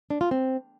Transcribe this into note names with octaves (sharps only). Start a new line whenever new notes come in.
D4
F4
C4